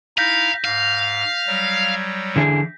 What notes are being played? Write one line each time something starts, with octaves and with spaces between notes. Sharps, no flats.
D#4 E4 F5 G6 A#6 B6
G#2 F5
F#3 G3 C#5
D3 E3 G#4